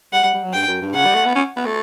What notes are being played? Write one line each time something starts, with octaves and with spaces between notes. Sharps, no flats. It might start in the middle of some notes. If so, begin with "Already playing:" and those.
G3 F#5
G3
G3
F#3
G2 G5
F#2
G2
C#3 F#5
G3
A3
B3
C#4
B3
A3